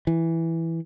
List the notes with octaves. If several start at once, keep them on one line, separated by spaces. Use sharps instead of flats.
E3